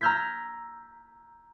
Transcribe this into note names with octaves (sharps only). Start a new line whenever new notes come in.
A#5 E6 F6 G6 G#6 B6